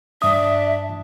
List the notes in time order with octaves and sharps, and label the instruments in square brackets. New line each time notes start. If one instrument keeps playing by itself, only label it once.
[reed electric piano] G2 D#6 [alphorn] D4 [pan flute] E5